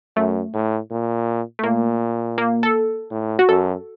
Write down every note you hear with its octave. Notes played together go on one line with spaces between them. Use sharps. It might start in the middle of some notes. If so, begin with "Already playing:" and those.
F#2 A3
A2
A#2
A3
A#2 A#3
A#3
A4
A2
F#4
F#2 A4